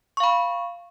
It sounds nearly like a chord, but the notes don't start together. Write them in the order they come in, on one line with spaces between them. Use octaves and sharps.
C#6 F5 B5